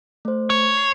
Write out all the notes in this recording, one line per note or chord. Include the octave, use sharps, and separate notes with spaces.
A3 C5
C#5
C7